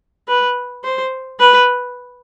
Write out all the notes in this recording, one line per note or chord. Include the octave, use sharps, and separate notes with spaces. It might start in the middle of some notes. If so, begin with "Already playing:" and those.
B4
C5
B4